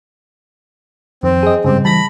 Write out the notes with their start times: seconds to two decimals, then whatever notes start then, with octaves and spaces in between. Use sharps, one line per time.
1.23 F2 D#3 C4
1.43 G#4 D#5
1.64 G1 G#2 C#3 G3 C4
1.85 E3 G3 A5 B5 A#6